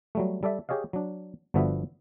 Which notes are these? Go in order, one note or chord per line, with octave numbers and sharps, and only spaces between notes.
F#3 G3 A3
G3 A4 D5 E5
G4 G#4 C#5 D#5 F5
F#3 D4
G1 D3 F3 B3 F#4 E5